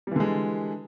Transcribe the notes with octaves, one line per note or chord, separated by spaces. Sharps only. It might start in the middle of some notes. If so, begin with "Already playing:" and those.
D3 E3 G3 G#3